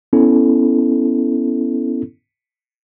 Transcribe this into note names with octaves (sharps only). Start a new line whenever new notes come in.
B3 C#4 E4 A4